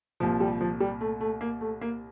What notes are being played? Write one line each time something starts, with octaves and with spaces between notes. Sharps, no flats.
C2 A#2 F3
G3
F3
G3
A3
A3
A#3
A3
A#3